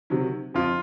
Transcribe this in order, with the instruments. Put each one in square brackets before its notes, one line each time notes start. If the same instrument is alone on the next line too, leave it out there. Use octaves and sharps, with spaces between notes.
[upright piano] C3 D#3 F#3
[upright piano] F2 [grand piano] F4